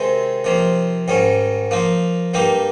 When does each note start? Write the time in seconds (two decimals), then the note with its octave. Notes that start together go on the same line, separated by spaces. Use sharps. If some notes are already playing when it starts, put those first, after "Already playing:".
Already playing: C3 D#3 G#3 C4
0.44 C3 F3 A#3
1.08 G#2 D#3 G3 C#4
1.71 F3 A#3 D#4
2.34 G2 G3 A#3 D#4 G4